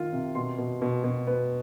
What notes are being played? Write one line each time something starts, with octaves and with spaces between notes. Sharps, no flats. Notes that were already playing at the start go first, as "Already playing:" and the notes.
Already playing: D#3 F4
C3
B2 C6
B2
B2
B2
B3